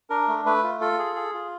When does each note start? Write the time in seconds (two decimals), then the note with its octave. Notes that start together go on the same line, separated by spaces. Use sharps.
0.10 D4 A#4
0.28 A3
0.45 A3 B4
0.63 F4
0.81 F4 A4
0.99 G#4
1.16 G#4
1.34 F4